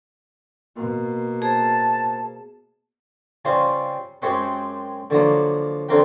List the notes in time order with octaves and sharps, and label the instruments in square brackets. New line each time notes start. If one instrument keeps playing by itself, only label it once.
[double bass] B2 A#3
[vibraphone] G#4 C5 [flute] A5
[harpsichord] C#3 G3 C4 F4
F#2 G#3 C4 G4 C#6 D6
D3 F3 F#3 A#3
F2 D3 C4 A#4 G5